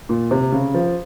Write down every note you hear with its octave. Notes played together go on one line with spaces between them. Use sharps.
A#2
C3
C#3
F3